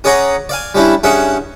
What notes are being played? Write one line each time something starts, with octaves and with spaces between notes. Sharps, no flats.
C#4 G#4 C#5 D5 F#5 A#5
D5 F5 G#5
G3 C#4 D4 E4
G2 C#4 G#4 E5 F#5